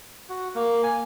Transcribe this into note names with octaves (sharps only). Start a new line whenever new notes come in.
F#4
A#3
G#5